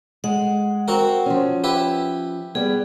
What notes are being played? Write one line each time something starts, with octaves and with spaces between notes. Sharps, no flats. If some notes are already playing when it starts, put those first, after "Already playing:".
G#3 F#5
C4 F#4 A#4
F3 C#4
E4 G4 B4
G3 B3 G#4